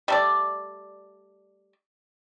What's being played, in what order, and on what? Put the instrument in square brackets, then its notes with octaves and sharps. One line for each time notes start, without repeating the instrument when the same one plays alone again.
[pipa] G3 A3 D5